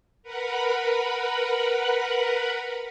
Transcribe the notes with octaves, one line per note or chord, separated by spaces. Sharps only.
A#4 B4 F#5 B5